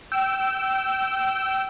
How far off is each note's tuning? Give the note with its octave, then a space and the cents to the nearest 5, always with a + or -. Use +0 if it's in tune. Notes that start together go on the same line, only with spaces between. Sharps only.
G5 -25 E6 +0